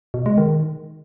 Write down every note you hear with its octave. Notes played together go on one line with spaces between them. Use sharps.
B2
G#3
D#3